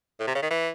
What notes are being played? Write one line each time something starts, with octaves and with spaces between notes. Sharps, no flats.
A2
C3
C#3
D#3
E3